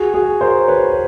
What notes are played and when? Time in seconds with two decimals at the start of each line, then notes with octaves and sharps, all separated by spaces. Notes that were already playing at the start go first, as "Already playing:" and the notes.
Already playing: F#4 G#4
0.14 F#4 G#4
0.41 A#4 C5
0.68 B4 C#5
0.90 B4